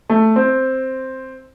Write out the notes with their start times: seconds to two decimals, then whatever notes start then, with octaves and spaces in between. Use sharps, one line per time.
0.10 A3
0.36 C4